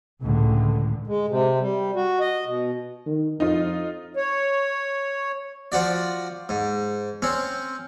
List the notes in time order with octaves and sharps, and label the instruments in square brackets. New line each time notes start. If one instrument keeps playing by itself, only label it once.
[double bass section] C#2 A2 D3
[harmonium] G#3
C3
G3
F#4
D#5
B2
[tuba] D#3
[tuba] F2 [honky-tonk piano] D#4 F4
[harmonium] C#5
[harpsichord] F3 F#4 D5
G#2
C4 C#4